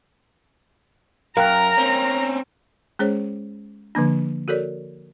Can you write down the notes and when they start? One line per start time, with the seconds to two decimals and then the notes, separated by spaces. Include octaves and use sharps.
1.37 F#2 A#4 F5 G5 A#5 F#6
1.78 C4 C#4
2.99 G#3 C#4 G#4 C5 C#5
3.95 D3 F3 A#3 D4
4.48 F#4 A4 A#4 C#5 D5